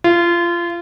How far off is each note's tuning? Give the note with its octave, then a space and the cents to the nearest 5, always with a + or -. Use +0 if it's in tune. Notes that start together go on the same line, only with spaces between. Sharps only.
F4 -25